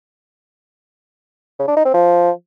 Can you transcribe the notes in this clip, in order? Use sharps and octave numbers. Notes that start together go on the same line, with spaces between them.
C#3
D4
D#4
C4
F3